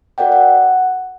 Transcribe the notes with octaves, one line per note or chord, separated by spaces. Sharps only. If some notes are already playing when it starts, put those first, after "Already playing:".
F#4 A#4 D5 F#5 G5
F#5